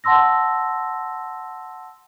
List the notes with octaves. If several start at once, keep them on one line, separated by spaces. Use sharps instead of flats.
F#5 A5 C6 E6 A#6